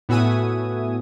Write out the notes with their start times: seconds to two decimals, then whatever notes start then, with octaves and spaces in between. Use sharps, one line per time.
0.09 A2 B3 F#4 E5 G#5 D#6